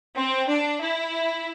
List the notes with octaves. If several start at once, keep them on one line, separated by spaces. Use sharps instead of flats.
C4
D4
E4